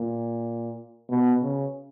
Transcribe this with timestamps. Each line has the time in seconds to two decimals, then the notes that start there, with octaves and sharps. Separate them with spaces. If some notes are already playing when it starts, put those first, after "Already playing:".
Already playing: A#2
1.09 B2
1.42 C#3